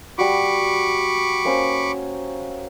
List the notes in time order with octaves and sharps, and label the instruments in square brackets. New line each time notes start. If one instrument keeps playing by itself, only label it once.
[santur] G3 F#4 [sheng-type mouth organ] B5 C#6 D6
[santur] A#3 C#4 C5